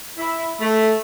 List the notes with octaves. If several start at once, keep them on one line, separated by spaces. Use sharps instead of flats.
E4
A3